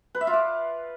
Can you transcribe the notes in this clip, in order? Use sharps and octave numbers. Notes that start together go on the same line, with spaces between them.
B4
E5
F4
D5